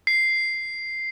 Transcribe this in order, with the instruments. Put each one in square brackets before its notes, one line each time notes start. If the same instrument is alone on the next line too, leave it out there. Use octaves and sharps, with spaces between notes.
[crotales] C7